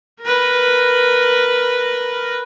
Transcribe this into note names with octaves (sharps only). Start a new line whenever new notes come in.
A#4 B4